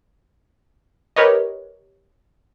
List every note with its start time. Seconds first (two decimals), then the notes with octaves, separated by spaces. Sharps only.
1.16 G4 A#4 B4 C#5 D#5